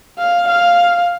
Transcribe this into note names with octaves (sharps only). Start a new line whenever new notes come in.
F5
F5